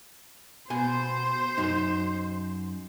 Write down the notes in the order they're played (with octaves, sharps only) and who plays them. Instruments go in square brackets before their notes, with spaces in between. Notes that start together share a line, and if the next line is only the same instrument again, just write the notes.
[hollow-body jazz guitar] B2 G#5 [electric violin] C5
[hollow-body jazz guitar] F#2 D#4